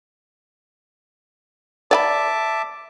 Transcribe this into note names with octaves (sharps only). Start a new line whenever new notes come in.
D5 E5 G5 A5 B5 D6